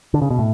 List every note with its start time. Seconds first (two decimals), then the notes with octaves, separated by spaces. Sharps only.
0.14 D3
0.22 C#3
0.30 B2
0.39 A2